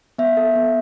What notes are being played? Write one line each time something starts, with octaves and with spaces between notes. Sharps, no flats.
B3 E5
A4
B3